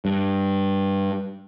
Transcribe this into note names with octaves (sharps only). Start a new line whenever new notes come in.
G2